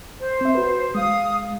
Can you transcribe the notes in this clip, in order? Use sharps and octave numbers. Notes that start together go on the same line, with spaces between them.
C5
C4 E5
F#4 B4
G#3 F5 D#6